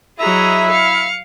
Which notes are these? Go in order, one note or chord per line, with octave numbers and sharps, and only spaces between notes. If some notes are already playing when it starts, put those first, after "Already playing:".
F#3 E4 G#4 D#5 E5 A#5
F5 C#7